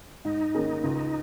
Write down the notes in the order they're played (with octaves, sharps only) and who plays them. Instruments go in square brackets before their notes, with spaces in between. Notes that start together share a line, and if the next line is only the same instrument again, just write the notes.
[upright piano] G#2 [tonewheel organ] D#4
[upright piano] D#3 A#3 C#4 G#4
C#2